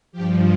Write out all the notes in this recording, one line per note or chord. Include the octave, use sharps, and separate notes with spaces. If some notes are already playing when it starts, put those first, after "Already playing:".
G2 F3 G4